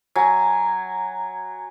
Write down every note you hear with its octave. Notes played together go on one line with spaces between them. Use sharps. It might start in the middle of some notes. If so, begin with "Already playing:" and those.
F#3 G#5